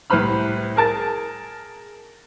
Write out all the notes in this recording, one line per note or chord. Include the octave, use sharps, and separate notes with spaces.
C2 A2 B4 C5 B5 F6
G#4 A#4 A5 A6